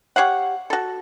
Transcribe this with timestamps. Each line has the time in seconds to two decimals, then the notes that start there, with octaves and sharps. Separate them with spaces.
0.16 G4 C#5 F5 F#5
0.70 F#4 A4